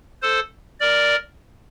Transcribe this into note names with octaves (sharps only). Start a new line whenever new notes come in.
A4 C5
A#4 D5